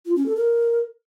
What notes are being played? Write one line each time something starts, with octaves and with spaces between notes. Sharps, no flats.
F4
C#4
A4
A#4